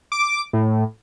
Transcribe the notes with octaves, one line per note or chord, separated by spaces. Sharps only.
D6
A2